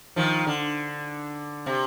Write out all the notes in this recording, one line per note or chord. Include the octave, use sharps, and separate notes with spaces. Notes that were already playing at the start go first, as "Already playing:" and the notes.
D#3 F3
D3
C3